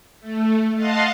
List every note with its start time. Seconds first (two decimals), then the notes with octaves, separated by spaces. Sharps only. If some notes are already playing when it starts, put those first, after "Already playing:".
0.20 A3
0.75 D#5 F5 F#5 A5 C6